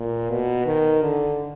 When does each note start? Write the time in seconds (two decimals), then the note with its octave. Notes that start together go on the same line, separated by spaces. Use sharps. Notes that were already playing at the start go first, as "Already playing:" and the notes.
Already playing: A#2
0.30 B2
0.66 D#3
1.02 D3